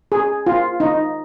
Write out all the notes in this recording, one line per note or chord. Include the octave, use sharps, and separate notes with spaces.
G#4
F4
D#4